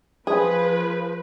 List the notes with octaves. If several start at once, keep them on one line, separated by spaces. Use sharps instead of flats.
F3 G#4 B4